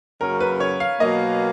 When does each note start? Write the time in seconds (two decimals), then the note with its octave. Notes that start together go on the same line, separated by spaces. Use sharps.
0.21 F#2 C#3 F#3 A#3 C#4 A#4
0.40 B4
0.60 C#5
0.80 F5
1.00 B2 F#3 A#3 D#5